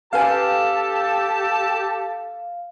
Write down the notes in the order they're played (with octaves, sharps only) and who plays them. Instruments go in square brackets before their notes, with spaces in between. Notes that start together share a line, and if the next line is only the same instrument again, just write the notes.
[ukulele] C#4 B4 G#5 [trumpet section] G4 [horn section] A4 A5 [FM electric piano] F5